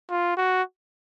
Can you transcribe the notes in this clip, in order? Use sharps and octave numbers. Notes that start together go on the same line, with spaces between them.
F4
F#4